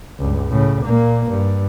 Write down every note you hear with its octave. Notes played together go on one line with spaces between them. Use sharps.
C#2 G2
A2 C#3
A#2 A#3
G2